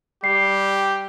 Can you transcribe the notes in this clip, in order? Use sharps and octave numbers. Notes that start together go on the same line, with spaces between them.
G3 G4 C7